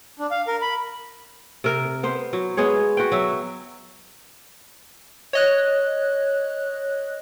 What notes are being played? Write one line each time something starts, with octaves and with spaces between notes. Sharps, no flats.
D4
F5
A#4
B5
C3 A#4
B3 C5
F#3
G#3 B3 G#4 C#5
F#4 B4 G5
F#3 E5
C#5 D#5 F#6